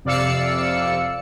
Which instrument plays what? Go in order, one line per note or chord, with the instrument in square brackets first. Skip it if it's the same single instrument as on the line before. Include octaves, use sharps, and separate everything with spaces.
[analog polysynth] F2 C3 D5 F5 E6 C#7